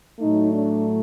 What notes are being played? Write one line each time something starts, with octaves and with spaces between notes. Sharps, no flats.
A2 F#3 A3 D#4
D4